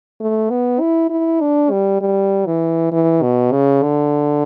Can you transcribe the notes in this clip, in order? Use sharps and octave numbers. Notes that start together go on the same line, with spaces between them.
A3
B3
E4
E4
D4
G3
G3
E3
E3
B2
C#3
D3